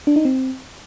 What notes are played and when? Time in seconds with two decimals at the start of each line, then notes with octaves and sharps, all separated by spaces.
0.07 D4
0.16 D#4
0.25 C4